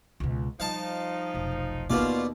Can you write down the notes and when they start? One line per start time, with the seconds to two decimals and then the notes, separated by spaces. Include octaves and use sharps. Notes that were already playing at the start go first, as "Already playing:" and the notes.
0.20 C#2 B2
0.60 F3 G3 D#4 F5 A5
1.34 F1 B1
1.90 D#2 B2 F4 D5